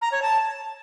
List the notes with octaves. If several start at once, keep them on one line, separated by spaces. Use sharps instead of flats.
A#5
C#5
A5